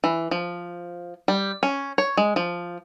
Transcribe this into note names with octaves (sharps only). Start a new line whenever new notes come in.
E3
F3
G3
C#4
C#5
G#3
F3